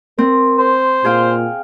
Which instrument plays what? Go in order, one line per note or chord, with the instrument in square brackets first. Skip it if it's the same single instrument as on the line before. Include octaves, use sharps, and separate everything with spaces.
[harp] C4 [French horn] A#4
[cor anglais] C5
[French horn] A#2 [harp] G#4 F5 G5